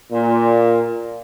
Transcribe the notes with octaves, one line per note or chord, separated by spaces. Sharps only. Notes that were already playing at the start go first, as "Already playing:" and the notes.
A#2